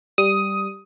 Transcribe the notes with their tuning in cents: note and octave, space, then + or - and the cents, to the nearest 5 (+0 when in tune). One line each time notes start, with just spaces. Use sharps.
G3 +0 D#6 +10